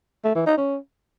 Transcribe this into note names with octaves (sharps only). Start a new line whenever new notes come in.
A3
E3
D#4
C#4